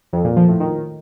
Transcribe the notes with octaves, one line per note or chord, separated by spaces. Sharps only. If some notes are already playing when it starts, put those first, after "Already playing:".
F2
A#2
F3
A2
D#3